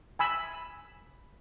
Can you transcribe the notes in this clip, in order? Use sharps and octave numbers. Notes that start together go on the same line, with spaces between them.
G#5 B5 E6